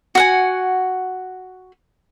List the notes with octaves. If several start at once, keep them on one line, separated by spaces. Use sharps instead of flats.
F#4 F#5 G#5